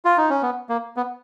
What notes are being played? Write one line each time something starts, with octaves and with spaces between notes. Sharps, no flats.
F4
D#4
C#4
B3
A#3
B3